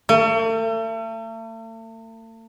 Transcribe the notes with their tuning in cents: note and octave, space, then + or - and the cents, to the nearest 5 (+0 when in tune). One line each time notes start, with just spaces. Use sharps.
A3 +40